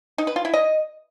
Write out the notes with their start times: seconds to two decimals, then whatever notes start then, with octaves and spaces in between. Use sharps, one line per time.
0.18 D#4
0.27 B4
0.36 F4
0.45 E4
0.54 D#5